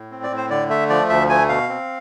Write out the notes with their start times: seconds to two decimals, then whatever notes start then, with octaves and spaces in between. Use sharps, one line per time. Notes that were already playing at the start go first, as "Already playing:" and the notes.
Already playing: A2
0.11 C4
0.23 D5
0.30 A2
0.37 C5
0.50 D3 D5
0.69 A3 E5
0.90 F3 D5
1.10 D2 E5
1.29 A3 G#5
1.49 B2 F5
1.69 C4